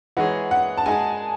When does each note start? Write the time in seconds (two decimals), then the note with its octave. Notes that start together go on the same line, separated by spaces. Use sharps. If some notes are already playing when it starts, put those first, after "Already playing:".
0.17 E3 G#3 D#4 G#4 C#5 F#5
0.51 F#5
0.77 A5
0.86 G#3 D#4 G#4 G#5